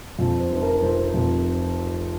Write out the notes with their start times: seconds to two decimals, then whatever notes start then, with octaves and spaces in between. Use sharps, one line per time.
0.19 F2
0.40 C5
0.51 F1
0.62 A#4
0.82 F1 C5
1.14 F2